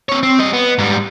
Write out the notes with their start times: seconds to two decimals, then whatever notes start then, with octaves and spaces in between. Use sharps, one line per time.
0.09 C4 C#5
0.23 C4
0.39 G3 D#5
0.53 B3
0.78 G#2 G3